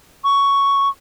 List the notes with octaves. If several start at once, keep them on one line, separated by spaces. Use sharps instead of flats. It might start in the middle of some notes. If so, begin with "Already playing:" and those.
C#6